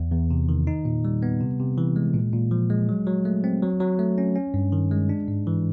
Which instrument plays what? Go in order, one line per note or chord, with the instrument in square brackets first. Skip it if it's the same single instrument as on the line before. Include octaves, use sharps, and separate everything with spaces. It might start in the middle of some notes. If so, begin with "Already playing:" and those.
Already playing: [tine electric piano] E2
E2
C3
D#3
D#4
A#2
G3
B3
C3
C3
E3
G#3
A#2
A#2
F3
G#3
F#3
F#3
A3
C4
F#3
F#3
A3
C#4
C#4
G2
D#3
G#3
D4
G#2
E3